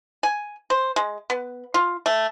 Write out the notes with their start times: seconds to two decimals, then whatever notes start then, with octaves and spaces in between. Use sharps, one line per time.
0.23 G#5
0.70 C5
0.96 G#3
1.30 B3
1.74 F4
2.06 A3